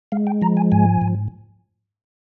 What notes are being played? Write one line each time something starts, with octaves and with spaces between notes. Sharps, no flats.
G#3 F5
G5
F3 A#5
G#5
G#2 G#5
G#2